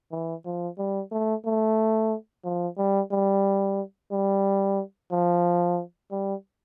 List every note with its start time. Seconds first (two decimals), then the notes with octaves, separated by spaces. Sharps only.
0.12 E3
0.45 F3
0.79 G3
1.12 A3
1.45 A3
2.44 F3
2.78 G3
3.12 G3
4.12 G3
5.12 F3
6.11 G3